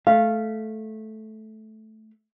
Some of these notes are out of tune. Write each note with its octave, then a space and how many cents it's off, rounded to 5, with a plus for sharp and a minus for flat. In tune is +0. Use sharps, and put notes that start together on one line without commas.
A3 -10 F5 -15